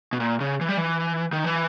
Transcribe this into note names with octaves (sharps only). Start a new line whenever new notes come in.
B2
A#2
C#3
E3
G3
E3
D#3
E3